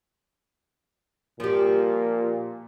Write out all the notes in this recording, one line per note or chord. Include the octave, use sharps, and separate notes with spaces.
A#2 F3 G4